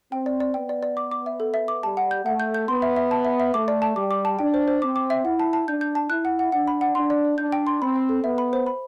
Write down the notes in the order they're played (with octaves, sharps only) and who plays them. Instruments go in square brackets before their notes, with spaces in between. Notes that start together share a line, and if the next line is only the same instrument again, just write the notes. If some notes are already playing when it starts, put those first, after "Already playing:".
[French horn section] C4 [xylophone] G5
[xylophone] D5
D5
[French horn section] B3 [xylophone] G5
[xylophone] D5
D5
D6
D6
E5
A4
E5
D6
[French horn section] G3 [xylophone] A5
[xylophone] F#5
G6
[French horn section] A3 [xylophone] F#5
[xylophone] G6
G6
[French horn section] B3 [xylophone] C6
[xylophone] E5
E5
A5
E5
E5
[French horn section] A3 [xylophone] D6
[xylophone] D5
A5
[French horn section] G3 [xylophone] D6
[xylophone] D6
A5
[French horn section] D4 [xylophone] G5
[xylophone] C5
C5
[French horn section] C4 [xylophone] D6
[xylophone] D6
E5
[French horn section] E4 [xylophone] F#5
[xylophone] A5
A5
[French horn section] D4 [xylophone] G6
[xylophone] G6
A5
[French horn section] E4 [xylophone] F#6
[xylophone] F#5
F#5
[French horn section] D4 [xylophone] F#5
[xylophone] B5
F#5
[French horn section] D4 [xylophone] C6
[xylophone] D5
D5
[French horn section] D4 [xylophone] G6
[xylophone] G5
C6
[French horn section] C4 [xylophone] B5
[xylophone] B5
A4
[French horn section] B3 [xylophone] E5
[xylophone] B5
C5
B5